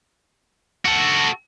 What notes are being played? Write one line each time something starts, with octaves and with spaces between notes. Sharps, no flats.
F#4 A4